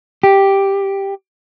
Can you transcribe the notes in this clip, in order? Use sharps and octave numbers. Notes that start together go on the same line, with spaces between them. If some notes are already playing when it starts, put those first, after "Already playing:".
G4